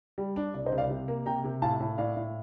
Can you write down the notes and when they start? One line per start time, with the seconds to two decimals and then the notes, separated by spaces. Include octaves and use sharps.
0.18 G3
0.36 D4
0.54 C2 D5
0.66 C5 D#5
0.72 C2
0.78 D5 F5
0.90 C3
1.08 A#3
1.26 C3 G5 A#5
1.44 C3
1.62 A2 F5 A5
1.80 A2
1.98 A2 D5 F5
2.16 A2